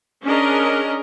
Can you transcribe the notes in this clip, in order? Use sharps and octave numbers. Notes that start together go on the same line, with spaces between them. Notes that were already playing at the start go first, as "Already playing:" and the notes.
C#4 D4 G#4 A#4 D#5